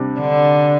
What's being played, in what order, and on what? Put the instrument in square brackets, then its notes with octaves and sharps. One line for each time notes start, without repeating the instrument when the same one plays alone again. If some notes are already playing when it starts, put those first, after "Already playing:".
Already playing: [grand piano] C3 G3 D4
[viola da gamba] D3